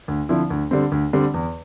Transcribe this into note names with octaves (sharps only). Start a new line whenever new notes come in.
D2
D3 F3 C4 E4
D2
D3 G3 C4
D2
D3 G3 C4
E2